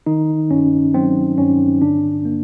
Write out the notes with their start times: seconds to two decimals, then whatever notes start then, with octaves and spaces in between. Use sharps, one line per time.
0.06 D#3 D#4
0.50 G2 C#4
0.94 F#3 C4
1.38 G2 C#4
1.82 D3 D4
2.25 A#3